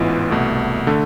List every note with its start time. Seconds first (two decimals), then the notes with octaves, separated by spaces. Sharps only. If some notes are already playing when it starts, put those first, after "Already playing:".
Already playing: A1 G#2 E3 B3 F4
0.30 C2 B2 A3
0.87 D3 A3